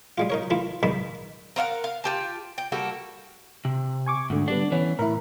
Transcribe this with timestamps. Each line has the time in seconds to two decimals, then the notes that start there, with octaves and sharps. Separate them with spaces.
0.18 G3 G#3 F4
0.30 D#4 A#4 C#5
0.50 E3 A3 E4 F4
0.83 G2 D#3 G#3 A5 B5
1.56 A#4 C5 F5 F#5
1.84 F5
2.04 F4 G4 A5
2.58 G5
2.72 G3 A#3 F#4 A4
3.65 C3
4.06 G#5 C#6 D6
4.30 D2 G#2 D3
4.48 D3 G3 B3 D4
4.72 E3 B3 C#4
4.99 A2 E4 A#4